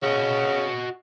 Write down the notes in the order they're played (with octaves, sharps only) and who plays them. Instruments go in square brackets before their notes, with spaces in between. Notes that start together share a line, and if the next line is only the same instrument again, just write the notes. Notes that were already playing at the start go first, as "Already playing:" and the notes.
[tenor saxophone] C#3 [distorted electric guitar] F#4 D#5